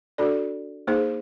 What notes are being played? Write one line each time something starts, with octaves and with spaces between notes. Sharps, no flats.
D4 F#4 A4 D5
A#3 D#4 G#4 C5